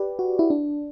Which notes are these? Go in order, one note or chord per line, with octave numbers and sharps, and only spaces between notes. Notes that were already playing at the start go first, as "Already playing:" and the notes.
Already playing: G4 B4 D5
F#4
E4
D4